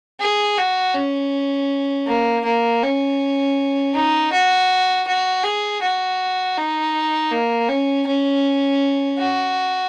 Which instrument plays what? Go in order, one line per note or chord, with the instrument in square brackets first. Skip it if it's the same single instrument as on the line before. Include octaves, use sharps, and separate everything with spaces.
[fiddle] G#4
F#4
C#4
A#3
A#3
C#4
D#4
F#4
F#4
G#4
F#4
D#4
A#3
C#4
C#4
F#4